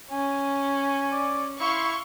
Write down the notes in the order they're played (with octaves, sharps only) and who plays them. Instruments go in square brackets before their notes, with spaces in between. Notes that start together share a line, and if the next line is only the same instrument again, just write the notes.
[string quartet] C#4 [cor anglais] G#5
[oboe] D5
[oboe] E4 [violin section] F5 C6 C#6